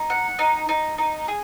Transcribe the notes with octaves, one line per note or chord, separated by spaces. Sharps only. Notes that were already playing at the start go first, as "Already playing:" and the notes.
Already playing: D#4
F#5
D#4
D#4
D#4
G#4